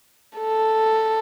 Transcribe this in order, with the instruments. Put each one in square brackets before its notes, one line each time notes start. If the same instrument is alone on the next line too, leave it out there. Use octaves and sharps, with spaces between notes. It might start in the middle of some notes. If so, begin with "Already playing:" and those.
[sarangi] A4